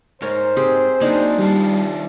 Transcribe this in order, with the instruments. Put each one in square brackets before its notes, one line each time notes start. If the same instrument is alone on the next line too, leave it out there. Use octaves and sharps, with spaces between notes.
[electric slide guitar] G#2 [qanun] A#4 C#5 [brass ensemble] C5
[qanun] C4 G4 G#4
[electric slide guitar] F#3 A#3 [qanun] D4 D#4 G#4
[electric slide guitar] D#3 F4 A5 [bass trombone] G3